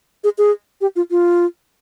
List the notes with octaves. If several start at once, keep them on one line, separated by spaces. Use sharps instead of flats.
G#4
G#4
G4
F4
F4